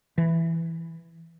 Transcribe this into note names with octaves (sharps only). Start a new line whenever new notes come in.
E3